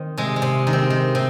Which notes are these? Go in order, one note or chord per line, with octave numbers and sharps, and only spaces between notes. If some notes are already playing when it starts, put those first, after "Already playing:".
Already playing: D#3 C4
C3 G#3
G#3
C3
D#3
C4
D#3
C3